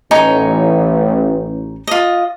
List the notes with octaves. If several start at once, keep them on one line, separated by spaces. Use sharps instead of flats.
A1 D#4 C#5 G#5
F4 D#5